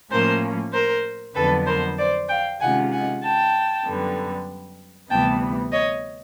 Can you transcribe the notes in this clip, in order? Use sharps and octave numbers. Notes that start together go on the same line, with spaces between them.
A2 F3 A#3 C#4 A#4 C5
A#4 C5
F2 D3 F#3 B3 A4 B4
A#4 C5
C5 D5
F5 G5
C3 D#3 G#3 C#4 F4 F#5 G#5
F#5 G#5
G5 A5
F#2 D3 G3 B3
D2 C3 E3 G3 B3 G5 A5
C#5 D#5